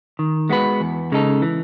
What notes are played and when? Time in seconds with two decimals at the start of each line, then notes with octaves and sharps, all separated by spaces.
0.19 D#3
0.49 G#3 B3 F#4 B4
0.80 E2
1.12 C#3 G#3 D#4 A4
1.42 E3